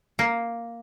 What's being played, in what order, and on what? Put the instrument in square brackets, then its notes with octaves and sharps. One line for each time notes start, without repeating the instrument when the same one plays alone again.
[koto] A#3